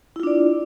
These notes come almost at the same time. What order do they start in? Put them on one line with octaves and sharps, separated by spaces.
E4 F4 D4 D5